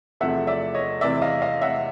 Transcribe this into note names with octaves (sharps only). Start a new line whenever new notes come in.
E2 C3 F3 A3 E5 F#5
D5 E5
C#5 D#5
E2 C3 E3 D5 E5
D#5 F5
D#5 F5
E5 F#5